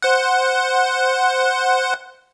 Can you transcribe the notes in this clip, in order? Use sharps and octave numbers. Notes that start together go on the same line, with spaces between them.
C5 F#5